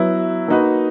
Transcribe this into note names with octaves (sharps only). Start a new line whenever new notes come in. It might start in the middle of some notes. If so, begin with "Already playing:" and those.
Already playing: F#3 B3 E4
A#3 D#4 F#4 B4